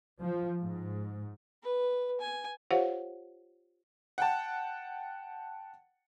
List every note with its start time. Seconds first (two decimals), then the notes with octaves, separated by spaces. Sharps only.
0.22 F3
0.62 G#2
1.62 B4
2.20 G#5
2.71 F4 G4 C5 C#5 F5 F#5
4.18 F#5 G5 A5